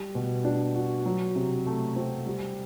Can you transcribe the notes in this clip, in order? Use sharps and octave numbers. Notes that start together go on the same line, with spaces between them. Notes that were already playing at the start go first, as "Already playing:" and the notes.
Already playing: G3
B2
D4
F#4
F#3
C3
A3
C4
G3